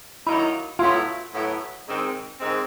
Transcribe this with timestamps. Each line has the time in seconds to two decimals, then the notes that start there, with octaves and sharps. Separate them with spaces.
0.27 D#3 F#3 A#3 D#4 E4
0.79 A2 F#3 B3 E4 F4
1.33 A2 F#3 B3 E4
1.86 G#2 D#3 G#3 C4
2.39 G#2 D#3 G#3 C4